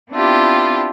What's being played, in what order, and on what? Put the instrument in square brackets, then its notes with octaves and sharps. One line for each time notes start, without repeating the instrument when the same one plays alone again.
[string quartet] B3 C4 D4 E4 F4 G4